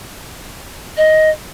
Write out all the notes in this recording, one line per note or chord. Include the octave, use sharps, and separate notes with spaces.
D#5